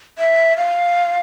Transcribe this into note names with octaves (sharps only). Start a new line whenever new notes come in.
E5
F5